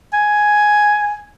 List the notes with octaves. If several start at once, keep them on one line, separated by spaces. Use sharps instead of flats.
G#5